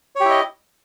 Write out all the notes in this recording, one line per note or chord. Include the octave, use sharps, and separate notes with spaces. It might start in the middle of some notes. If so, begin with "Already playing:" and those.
E4 G4 C#5 D#5